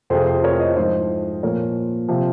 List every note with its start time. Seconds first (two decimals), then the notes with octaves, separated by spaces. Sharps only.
0.10 F2 C3 F3 G#4 C5
0.27 G#4 C5
0.43 A#4 C#5
0.60 C5 D#5
0.76 G#2 F3 C5 D#5
1.43 A#2 F3 A#4 C#5
2.08 C3 F3